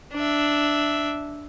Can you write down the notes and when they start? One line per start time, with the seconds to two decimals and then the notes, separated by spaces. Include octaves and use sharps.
0.14 D4 E5